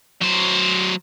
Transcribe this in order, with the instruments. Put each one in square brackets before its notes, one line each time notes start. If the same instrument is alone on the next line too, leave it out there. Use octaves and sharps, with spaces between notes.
[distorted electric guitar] F#3 C5